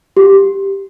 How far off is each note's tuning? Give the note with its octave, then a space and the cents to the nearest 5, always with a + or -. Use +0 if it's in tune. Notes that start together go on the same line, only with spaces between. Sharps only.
G4 +0